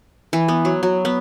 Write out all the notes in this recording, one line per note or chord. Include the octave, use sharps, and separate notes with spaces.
E3
B3
F#3
F#3
B3